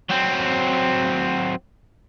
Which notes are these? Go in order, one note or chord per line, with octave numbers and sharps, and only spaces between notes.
F#3 C4